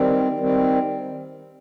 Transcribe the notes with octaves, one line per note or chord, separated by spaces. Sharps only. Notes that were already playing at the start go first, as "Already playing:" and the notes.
Already playing: D#3 G3 C4
D#3 G3 C4